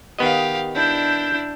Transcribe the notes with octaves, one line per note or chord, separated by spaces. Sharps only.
D#3 B3 G4 D#5 F5
D4 E4 G6